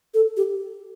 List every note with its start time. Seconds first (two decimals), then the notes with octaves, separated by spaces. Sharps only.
0.14 A4
0.37 G4